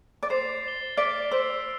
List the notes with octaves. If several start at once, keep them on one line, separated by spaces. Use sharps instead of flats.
D5
C5 A6 C7 F7
A6 E7 G7
D5 F6 B6 D7
C5 E6 B6 F7